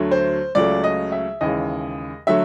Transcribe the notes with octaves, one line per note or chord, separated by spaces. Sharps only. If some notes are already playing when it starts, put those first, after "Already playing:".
Already playing: D2 D3 F#3 A3
C5
C#2 C#3 F#3 A3 D5
D#5
E5
D#2 C#3 E3 G#3 D#5
D3 F#3 A3 E5